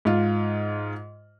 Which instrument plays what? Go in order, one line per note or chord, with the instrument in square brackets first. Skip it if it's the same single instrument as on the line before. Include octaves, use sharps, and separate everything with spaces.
[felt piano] G#2 F4